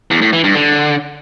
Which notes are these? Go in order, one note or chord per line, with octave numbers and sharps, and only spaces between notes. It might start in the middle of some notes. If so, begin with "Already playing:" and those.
E2
A2
E3
G2
D3